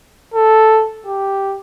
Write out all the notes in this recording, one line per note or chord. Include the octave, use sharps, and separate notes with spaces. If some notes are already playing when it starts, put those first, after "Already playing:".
A4
G4